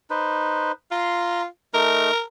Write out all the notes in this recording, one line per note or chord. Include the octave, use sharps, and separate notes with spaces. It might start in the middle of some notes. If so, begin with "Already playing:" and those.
D#4 B4 C5
F4 A#5 C6
A3 D#4 A#4